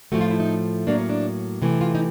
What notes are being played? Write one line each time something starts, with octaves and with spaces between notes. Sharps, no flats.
A2 F3 A3 F#4
F4
E4
D#4
A2 F#3 A#3 D4
C#4
D4
C3 E3 A3
F4
D#4